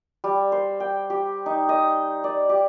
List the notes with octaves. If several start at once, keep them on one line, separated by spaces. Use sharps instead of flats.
G3
C5
G5
G4
D#4
D#5
D5
G4